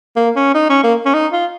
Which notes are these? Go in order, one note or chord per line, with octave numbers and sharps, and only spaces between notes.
A#3
C#4
D#4
C#4
A#3
C#4
D#4
F4